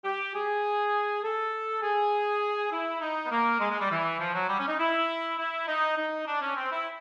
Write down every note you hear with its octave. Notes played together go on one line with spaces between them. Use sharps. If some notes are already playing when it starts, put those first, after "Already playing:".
G4
G#4
A4
G#4
E4
D#4
B3
A#3
G#3
G#3
G3
E3
F3
F#3
G3
C#4
D#4
E4
E4
D#4
D#4
D4
C#4
C4
E4